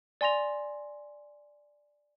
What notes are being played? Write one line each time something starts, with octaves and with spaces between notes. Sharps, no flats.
D5 G#5 C6 A#6 F7